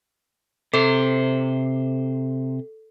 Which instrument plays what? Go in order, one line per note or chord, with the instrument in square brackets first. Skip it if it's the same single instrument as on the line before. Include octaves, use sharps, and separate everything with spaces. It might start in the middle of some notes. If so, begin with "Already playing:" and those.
[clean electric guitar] C3 C5 [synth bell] A4